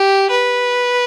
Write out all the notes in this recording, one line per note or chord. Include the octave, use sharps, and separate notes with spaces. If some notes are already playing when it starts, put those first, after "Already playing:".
Already playing: G4
B4